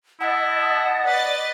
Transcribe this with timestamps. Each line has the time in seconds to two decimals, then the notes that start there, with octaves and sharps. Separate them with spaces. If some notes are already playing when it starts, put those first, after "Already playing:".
0.20 E4 D#5 F#5 A5
1.06 B4 D5 D#5 A6